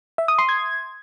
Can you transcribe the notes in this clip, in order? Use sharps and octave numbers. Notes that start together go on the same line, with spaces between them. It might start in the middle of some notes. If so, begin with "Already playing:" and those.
E5
D#6
C6
G#6